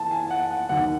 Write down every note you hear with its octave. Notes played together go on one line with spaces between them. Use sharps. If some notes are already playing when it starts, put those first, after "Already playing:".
Already playing: E3 A5
G#5
F#5
F#5
D#2 D#3 F#3 F#5